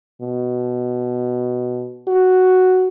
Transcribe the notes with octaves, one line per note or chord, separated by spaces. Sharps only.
B2
F#4